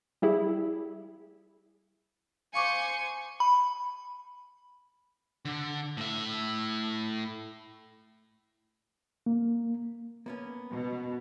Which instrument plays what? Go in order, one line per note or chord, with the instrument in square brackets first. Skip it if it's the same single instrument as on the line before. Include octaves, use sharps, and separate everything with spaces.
[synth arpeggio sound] G3 E4 G#4
[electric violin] C5 C#7 [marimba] F5 C#6 D6 [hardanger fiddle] G#5
[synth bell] B5
[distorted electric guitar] D3
A2 E5
[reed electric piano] A#3
[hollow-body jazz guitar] A#3 B3 C#4
[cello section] B2